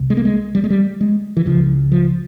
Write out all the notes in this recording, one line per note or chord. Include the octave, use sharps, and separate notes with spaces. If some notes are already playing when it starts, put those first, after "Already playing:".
Already playing: C2 C3
G#3
A#3
G#3
G3
G#3
G3
G#3
E3
C#2 C#3 F3
F3